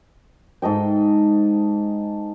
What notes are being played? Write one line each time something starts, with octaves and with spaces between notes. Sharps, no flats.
G#2 A4 D#5 G5